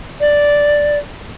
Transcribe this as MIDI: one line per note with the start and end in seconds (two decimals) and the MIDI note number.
0.21 0.98 74